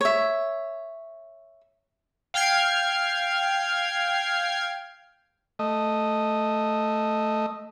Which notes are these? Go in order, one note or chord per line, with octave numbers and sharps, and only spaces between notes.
C#5 E5
F5 G5 F6 G#6 C7
A3 D#5